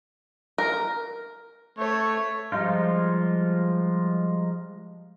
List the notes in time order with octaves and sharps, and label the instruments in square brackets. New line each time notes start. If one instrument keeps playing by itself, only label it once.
[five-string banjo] A#4
[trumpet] A3 [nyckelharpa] C#5
[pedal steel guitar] F3 G3 G#3 D#4 F4